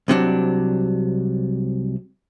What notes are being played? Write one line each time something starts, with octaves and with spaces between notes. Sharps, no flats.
C2 C3 F#3 D4